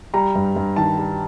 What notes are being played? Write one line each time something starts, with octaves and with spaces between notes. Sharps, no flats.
G3 A#5
G2
G2
D#3 A5
G3